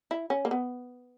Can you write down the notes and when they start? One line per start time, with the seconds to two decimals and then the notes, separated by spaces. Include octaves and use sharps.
0.11 E4
0.30 C#4
0.45 A#3
0.51 B3